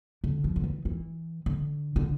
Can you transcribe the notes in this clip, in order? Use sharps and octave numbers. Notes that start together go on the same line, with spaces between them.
D3
F3
D3
E3
E3
D3
D3